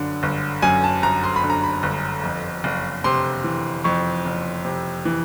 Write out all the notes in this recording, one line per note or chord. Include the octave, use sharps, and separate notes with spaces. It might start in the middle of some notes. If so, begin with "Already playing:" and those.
Already playing: G1 F#2 D3
G1
F#2 G#5
A5
G1 A#5
C6
B5
D3
A#5
B5
G1
F2
F#1
C3 C6
E3
F2 C#6
F#1
C3
E3